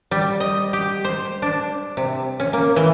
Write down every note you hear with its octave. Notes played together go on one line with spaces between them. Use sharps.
G3
D#5
G4
C5
D4
C3
C#4
A#3
E3